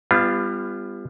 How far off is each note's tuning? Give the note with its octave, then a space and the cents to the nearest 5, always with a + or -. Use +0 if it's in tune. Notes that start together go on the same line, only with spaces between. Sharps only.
G3 +30 B3 +20 F4 -20